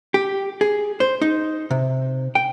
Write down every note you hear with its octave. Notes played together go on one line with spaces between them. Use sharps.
G4
G#4
C5
D#4
C3
G5